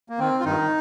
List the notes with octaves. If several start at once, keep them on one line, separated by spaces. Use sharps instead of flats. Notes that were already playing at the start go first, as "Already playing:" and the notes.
A#3
D#3 C4
F4
G2 D#3 D#4